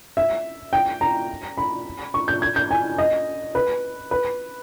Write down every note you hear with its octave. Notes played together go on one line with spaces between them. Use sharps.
E5
G5
A#5
B5
C#6
G6
G#6
G6
G#5
D#5
B4
B4